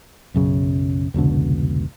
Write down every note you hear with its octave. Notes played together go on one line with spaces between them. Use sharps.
B1 F#2 C#3
F1 C#2 B2 D3